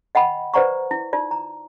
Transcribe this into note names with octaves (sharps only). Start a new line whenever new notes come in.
D#5 F#5 G5 B5
B4 C5 D5 F#5 A#5 C#6
E4
D#4 F4 D5
A#5